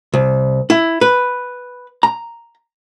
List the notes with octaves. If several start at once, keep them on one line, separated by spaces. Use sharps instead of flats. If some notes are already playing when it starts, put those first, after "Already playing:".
C2
E4
B4
A#5